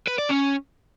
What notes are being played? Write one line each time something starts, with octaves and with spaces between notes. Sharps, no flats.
B4
D5
C#4